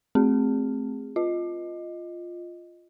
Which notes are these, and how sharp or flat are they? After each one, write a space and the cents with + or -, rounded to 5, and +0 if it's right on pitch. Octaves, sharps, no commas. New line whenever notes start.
A3 -25 C4 +0 G#4 -25
F4 +0 D#5 +0